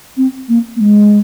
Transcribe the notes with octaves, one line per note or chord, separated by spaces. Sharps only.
C4
A#3
A#3
G#3